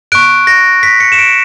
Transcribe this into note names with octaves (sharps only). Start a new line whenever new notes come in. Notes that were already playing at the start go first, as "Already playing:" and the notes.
C#6 F#6 D7
A#6
B6
C#7
E7
D7